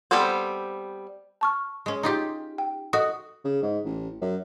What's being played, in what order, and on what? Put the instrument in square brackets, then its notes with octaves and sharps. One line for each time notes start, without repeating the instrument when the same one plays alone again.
[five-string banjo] G3 B3 C4 A4 C5
[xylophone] A5 C#6 F6
[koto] G#3 C#4
D#4 F4 G4
[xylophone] G5
[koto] F#4 [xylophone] A4 D#5 D#6
[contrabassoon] C#3
G#2
A1
F#2